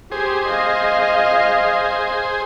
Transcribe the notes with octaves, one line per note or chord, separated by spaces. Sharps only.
G4 G#4 C5
D#5 F5